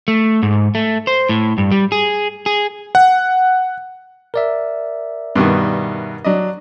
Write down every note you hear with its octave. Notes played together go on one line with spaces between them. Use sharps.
A3
G#2
A3
C5
A2
G2
G3
G#4
G#4
F#5
A#4 D5 E5
G2 B2 D#3
F#3 D4 D#5